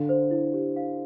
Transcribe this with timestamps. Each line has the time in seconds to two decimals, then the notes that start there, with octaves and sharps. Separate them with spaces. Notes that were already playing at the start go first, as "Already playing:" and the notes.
Already playing: D3 F5
0.09 C5
0.31 E4
0.54 G4
0.76 F5